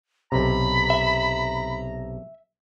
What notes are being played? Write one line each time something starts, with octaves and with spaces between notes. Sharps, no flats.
B1 C3 A#5 B5
E5